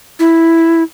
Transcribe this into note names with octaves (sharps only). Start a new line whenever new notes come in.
E4